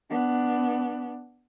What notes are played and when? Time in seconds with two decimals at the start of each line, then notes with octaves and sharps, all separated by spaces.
0.10 B3 D4